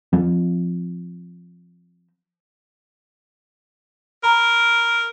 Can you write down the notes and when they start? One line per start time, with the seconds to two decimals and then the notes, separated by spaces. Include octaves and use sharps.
0.13 F3 C4
4.23 A#4 A#5 B5